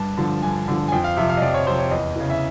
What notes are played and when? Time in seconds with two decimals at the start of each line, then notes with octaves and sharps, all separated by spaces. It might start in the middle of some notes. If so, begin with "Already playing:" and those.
Already playing: G2 A5
0.18 D3 F3
0.42 G2 G#5
0.68 D3 F3
0.88 G#5
0.92 F2 G5
1.04 F5
1.17 C3 F3 E5
1.29 F5
1.37 D#5
1.42 F2 D5
1.54 C#5
1.67 C3 F3 C5
1.79 C#5
1.91 E2 D#5
2.16 C#3 E3
2.30 E5